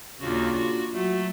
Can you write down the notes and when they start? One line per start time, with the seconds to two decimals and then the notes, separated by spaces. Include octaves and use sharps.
0.20 D#2 A#2 C#3 D4 F4 F#4
0.53 F#4
0.93 F#3 A3 F#4